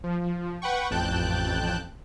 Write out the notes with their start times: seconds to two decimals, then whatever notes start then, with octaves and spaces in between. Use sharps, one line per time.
0.04 F3
0.62 B4 F#5 G5 C#6
0.90 A1 F2 G5 A5 F#6 G6